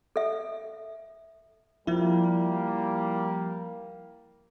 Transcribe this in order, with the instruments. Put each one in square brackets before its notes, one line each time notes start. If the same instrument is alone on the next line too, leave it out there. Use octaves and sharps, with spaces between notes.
[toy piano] A4 E5
[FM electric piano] F3 E4 [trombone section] G3 A#3